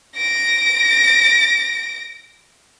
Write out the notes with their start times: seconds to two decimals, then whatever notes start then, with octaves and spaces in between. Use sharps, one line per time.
0.17 A#6 D7